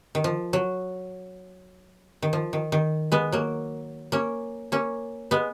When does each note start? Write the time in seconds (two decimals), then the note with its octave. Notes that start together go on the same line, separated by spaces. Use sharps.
0.15 D#3
0.24 F3
0.53 F#3
2.23 D#3
2.33 F3
2.53 D#3
2.72 D#3
3.12 G#3 B3
3.32 F#3 A#3
4.12 A#3 C#4
4.72 A#3 C#4
5.31 G#3 B3